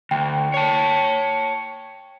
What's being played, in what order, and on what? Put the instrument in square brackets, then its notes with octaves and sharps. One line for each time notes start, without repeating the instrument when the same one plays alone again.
[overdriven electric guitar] D2 [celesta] G5
[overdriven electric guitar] C#5 A5